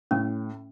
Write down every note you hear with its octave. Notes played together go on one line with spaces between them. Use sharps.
A2 C#4